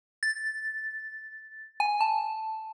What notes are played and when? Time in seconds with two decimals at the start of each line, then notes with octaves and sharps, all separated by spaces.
0.23 A6
1.80 G#5
2.01 A5